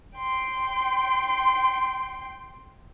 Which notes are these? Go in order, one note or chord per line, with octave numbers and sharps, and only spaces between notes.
G5 C6